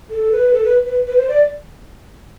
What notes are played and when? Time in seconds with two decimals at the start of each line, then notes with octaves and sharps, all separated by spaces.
0.10 A4
0.32 B4
0.53 A4
0.64 B4
0.85 B4
1.07 B4
1.17 C5
1.28 D5